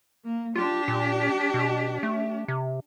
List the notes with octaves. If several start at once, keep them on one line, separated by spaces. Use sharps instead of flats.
A#3
D4 F4 G4
A#2
B2
A3
C3